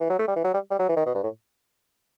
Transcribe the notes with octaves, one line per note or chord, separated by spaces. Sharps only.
E3
F#3
A3
G3
E3
F#3
G3
G3
F#3
E3
D#3
B2
G2
A2